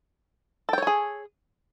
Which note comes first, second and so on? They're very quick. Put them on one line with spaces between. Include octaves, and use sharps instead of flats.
A4 G5 C#5 G#5 G#4